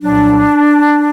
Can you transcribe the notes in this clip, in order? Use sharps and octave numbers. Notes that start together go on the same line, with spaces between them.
C2 A#2 F#3 D4